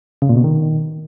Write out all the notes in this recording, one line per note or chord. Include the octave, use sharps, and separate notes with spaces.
C#3
A#2
B2
D#3